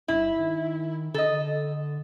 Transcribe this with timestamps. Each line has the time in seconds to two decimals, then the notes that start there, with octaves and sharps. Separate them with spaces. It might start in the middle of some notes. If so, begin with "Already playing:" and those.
0.08 G1 E4
0.39 D#3
1.14 D3 A4 D#5